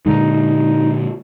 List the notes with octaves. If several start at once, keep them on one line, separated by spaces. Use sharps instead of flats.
A#2 D3 G#3 D#4